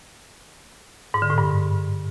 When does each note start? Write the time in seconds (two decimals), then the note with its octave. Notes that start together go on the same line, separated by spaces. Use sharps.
1.14 G#2
1.22 D3
1.30 A2
1.38 G2